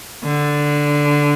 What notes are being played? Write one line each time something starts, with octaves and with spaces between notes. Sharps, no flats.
D3